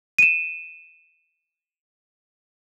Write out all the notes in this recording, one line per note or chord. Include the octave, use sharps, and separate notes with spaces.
D#7 E7